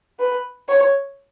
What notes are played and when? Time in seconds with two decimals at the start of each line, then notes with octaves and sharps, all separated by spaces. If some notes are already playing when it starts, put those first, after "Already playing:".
0.19 B4
0.69 C#5